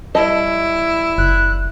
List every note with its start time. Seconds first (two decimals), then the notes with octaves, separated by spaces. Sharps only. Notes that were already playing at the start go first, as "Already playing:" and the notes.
0.15 G3 E4 D#5 A5
1.18 F#1 F#6